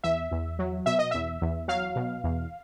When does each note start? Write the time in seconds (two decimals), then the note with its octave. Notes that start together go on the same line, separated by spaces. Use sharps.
0.03 E2 E5
0.31 E2
0.59 F#3
0.86 B2 E5
0.99 D#5
1.11 E2 E5
1.42 E2
1.68 F#3 F5
1.96 B2
2.24 E2